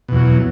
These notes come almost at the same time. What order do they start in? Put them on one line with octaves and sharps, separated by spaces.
B2 E2 F#3